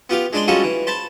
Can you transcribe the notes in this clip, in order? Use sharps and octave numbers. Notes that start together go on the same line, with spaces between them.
B3 F4 G4 F5
G#3 D4 D5 C6
G3 G#3 C#4 F4 F#4 A4
E3
C5 A5 B5